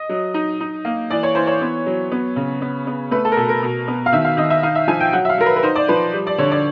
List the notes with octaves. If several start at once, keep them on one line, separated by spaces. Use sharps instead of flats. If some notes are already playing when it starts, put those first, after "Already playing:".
Already playing: D#5
F#3
D#4
D#4
A#3
E3 D5
C#5
E3 C5
C#5
B3
F#3
B3
C#3
B3
B3
A3 B4
A4
A#4
B2 A4
A#4
B2
B3
F5
D#3 E5
F5
D#3 D#5
E5
D#4 F5
E5
F3 G#5
G5
F#3 F#5
E5
F5
F#3 A#4
B4
B4
D#4 C5
D5
F3 B4
G3
D5
D3 C#5
D5